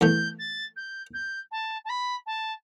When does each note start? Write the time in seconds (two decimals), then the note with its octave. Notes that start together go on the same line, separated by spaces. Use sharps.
0.01 E2 E3 A3 G6
0.38 A6
0.76 G6
1.13 G6
1.51 A5
1.84 A5
1.89 B5
2.26 A5